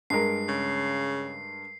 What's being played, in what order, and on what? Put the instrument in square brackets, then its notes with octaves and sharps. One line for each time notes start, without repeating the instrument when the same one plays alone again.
[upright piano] G2 G#3 A#4 [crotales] C7
[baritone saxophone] C#3